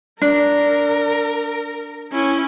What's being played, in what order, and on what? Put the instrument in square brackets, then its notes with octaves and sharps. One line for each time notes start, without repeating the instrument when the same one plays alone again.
[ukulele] D4 [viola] A#4
[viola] C#4 E4